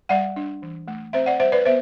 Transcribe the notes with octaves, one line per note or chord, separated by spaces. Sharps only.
G3 D5 F#5
D4
E3
A3
C4 C5 E5
D5 F#5
G3 C5 E5
B4 D5
B3 C5 E5